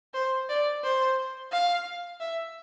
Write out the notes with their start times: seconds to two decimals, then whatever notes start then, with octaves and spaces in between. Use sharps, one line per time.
0.14 C5
0.49 D5
0.83 C5
1.52 F5
2.20 E5